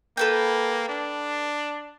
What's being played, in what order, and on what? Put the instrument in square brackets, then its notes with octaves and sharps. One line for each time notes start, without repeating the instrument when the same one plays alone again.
[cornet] A#3 [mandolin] A4 B4 G5
[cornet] D4